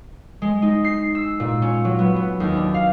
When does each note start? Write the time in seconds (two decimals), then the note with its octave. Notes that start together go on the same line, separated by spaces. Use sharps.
0.42 G#3
0.62 D#4
0.84 C7
1.15 E6
1.40 A#2
1.62 C#4
1.85 F#3
1.99 B3
2.16 B3
2.40 D#2
2.57 D4
2.74 F5